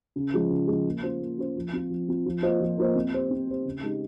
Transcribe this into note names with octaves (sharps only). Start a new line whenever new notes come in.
C#3
F3 G#3
C#3
G#3
F3
A#3
C#4 F4 C5
A#3
C#4 F4 C5
F3
C4 F4
F3
C4 F4
F3
A#3 F4 C5 D#5
F3
A#3 F4 C5 D#5
C4
G4 C5
C4
G4 C5
C#3
G#3 D#4 G4